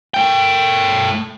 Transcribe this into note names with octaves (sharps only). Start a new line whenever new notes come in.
A3 G5